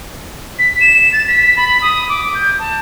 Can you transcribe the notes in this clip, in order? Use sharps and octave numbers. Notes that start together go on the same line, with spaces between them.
B6
E7
A6
B6
B5
D#6
D6
G6
A5